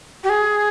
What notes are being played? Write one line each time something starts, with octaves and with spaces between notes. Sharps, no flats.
G4
G#4